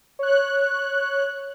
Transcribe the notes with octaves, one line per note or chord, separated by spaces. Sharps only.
C#5 F#6